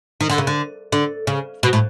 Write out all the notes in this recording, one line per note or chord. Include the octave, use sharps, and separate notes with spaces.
D#3
D3
C#3
D3
D3
C#3
B2
A2